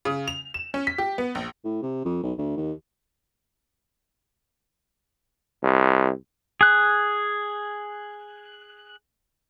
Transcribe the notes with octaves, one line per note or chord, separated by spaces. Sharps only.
C#3
F7
E7
C#4
B6
G4
B3
A#1
A2
C3
F2
B1
D2
D#2
C2
G#4 F#6